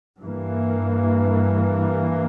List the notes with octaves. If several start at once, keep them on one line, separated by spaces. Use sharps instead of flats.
G2 E3 A#3